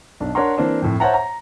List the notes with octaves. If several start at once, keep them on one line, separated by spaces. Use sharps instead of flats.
B1 D4
D4 A#4 C#5 F#5 A#5 C6
E3 A#3 C4 D4
F2 A2
C5 C#5 E5 F#5 A5 A#5
A#5